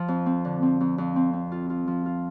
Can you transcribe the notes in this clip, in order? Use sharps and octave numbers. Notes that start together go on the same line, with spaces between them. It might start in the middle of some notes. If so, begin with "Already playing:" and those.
Already playing: F3
F2
C4
D3
C4
F2
F2
C4
C4
F4
F4
F3
F4